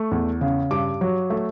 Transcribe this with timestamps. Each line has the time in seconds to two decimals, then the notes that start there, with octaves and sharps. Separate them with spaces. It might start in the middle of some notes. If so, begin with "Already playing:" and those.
Already playing: A3 C#6
0.11 E2
0.41 C#3
0.71 G2 D6
1.01 F#3
1.30 A3